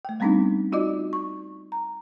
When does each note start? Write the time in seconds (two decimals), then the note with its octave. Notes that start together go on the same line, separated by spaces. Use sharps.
0.05 A3 G5
0.20 G3 A3 B3 C4 D4 D#4
0.72 D#4 F4 F#4 D5 D#5 D6
1.13 C#6
1.72 A#5